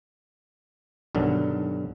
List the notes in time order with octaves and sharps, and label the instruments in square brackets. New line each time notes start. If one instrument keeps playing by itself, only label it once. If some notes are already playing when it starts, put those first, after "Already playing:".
[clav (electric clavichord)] B1 G2 D3 D#3 F#3